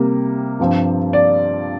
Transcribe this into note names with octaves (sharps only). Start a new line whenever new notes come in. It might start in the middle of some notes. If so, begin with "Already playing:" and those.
Already playing: C3 G3 A#3
G2 F3 C4
D5